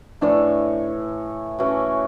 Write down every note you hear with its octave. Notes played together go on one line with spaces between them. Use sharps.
A2 E3 A3 D4
E3 A3 C#4 F#4